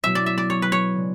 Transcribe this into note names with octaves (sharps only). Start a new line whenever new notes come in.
B2 F#3 C#4 E4 E5
D5
E5
D5
C#5
B4
C#5
C#3 G#3 D4